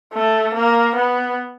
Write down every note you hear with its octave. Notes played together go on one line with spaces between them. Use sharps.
A3
A#3
B3